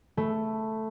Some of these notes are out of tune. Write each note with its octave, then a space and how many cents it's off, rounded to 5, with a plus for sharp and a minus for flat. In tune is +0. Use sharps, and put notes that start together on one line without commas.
A3 +0 B5 +0